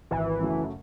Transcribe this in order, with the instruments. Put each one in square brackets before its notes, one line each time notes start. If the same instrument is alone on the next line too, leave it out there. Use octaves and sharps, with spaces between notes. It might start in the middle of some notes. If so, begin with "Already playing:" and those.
[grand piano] G#1 [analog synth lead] E3
[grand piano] F#2 C#3 F#3 A3